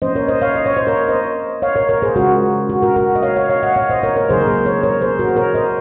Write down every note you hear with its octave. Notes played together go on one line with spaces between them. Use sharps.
F3 A#3 C#4 C5 D#5
A#4 C#5
C5 D#5
C#5 F5
D#5
C#5
C5
A#4 C#5
C5 D#5
C#5 F5
A#4 C#5
A#4 C#5
G#4 C5
C#3 G#3 C#4 F4 F#4 A#4
F#4
F#4 A#4
F#4 A#4
D#5
C#5 F5
C#5 F5
C#5 F5
D#5 F#5
C#5 F5
C5 D#5
A#4 C#5
A#4 C#5
C#3 F#3 A#3 D#4 G#4 C5
A#4
G#4 C5
A#4 C#5
A#4 C#5
G#4 C5
F#4 A#4
C5
A#4 C#5
C5 D#5